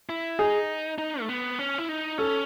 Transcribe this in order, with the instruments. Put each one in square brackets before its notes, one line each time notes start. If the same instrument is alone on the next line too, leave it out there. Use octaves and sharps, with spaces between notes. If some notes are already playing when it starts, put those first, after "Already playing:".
[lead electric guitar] E4
[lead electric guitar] D#4 [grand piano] G#4
[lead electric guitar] D#4
A3
B3
C#4
E4
D#4
[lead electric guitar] C#4 [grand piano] A4